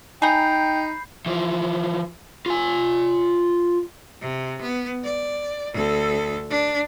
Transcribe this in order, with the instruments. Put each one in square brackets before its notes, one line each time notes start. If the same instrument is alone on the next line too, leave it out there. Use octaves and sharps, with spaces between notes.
[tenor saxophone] D#4 [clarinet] G5 [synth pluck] G#5 A#5 [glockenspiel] B5 G6 C7
[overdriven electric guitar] E3 F3
F4 G#5
[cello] C3
B3
D5
D2 A4
D4